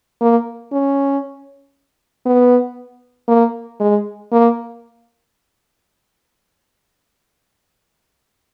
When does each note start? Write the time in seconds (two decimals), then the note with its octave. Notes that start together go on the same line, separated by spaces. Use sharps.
0.21 A#3
0.72 C#4
2.26 B3
3.29 A#3
3.80 G#3
4.33 A#3